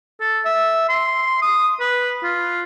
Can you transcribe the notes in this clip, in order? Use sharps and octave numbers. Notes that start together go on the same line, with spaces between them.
A4
E5
C6
D#6
B4
F4